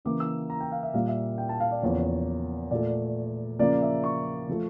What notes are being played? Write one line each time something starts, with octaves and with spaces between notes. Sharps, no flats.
C#3 E3 A#3 D6
E6
A#5
G5
F5
E5
A#2 G3 A#3 F5
E5
G5
A5
F5
D5
E2 C#3 F3 A#3 C#5
A#2 A3 D5
C#3 F3 A#3 D5
E5
C#6
F3 A3